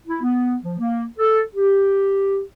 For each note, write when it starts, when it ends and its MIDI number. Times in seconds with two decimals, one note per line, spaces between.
0.07 0.22 64
0.22 0.55 59
0.64 0.74 53
0.79 1.04 58
1.18 1.40 69
1.55 2.41 67